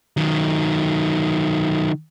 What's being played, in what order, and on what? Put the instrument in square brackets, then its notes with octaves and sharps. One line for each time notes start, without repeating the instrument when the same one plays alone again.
[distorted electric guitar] D#3 F#3